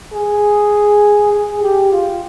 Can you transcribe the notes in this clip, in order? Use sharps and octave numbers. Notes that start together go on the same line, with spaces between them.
G#4
G#4
G4
F4